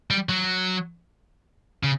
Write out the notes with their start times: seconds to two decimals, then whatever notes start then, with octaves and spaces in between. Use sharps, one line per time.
0.11 G3
0.29 F#3
1.83 C#3